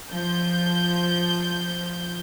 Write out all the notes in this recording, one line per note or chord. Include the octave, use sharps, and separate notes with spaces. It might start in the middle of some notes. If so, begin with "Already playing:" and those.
F3 G6